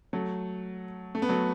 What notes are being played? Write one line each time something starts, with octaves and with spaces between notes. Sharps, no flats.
F#3 A3
A3
B3
F#3 A3